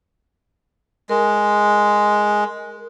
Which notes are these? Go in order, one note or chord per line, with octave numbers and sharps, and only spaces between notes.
G#3 A#4